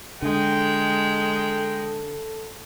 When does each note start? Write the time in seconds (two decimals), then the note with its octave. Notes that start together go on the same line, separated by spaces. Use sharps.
0.22 D3 G#3 A4 G5